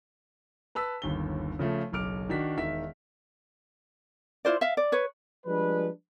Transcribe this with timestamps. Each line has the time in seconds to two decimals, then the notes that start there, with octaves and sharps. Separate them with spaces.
0.75 B4 A5 E6 B6
1.02 G1 D#2 G7
1.59 C#3 F3 A3
1.92 F#1 B1 D6 F6 D7
2.29 D#3 D4 F#4 B6
2.57 E1 D#3 E5 B6
4.45 E4 F4 C5 D5
4.61 E5 F5
4.77 D5
4.92 B4 C#5
5.46 F3 G3 G#3 D4 B4